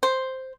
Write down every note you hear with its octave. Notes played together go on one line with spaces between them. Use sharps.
C5